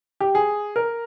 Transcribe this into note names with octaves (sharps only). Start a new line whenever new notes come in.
G4
G#4
A#4